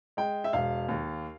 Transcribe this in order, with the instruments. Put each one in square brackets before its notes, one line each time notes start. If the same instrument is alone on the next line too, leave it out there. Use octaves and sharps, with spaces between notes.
[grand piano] G#3 G5
E5
E1 F5
D#2